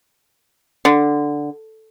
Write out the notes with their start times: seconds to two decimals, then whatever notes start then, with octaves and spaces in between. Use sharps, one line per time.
0.85 D3